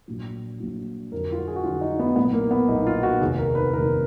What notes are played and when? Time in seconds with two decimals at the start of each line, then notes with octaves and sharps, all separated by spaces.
0.08 A#1 A#2 F#3
0.60 A#1 A#2 F#3
1.12 F2 D3 F#3 A#4
1.32 F4
1.38 F#4
1.48 G#4
1.56 F#4
1.64 F2 D3 F#3 F4
1.81 D#4
1.99 B3
2.16 B1 A#2 F#3 B3
2.33 A#3
2.51 B3
2.68 B1 A#2 F#3 D#4
2.87 F4
3.03 F#4
3.21 F1 D#2 D#3 G#4
3.38 A#4
3.55 B4
3.73 F1 D#2 D#3 A#4